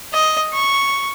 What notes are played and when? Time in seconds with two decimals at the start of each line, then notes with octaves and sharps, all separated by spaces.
0.13 D#5
0.53 C#6